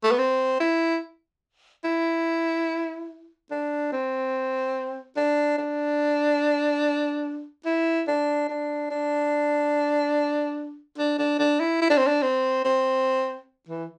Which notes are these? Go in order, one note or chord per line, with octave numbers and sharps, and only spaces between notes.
A3
B3
C4
E4
E4
D4
C4
D4
D4
E4
D4
D4
D4
D4
D4
D4
E4
E4
D4
C4
D4
C4
C4
E3